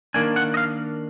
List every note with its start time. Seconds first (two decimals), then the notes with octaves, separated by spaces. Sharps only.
0.14 D#3 A#3 D4 G#5
0.36 F#5
0.54 D#5
0.57 F5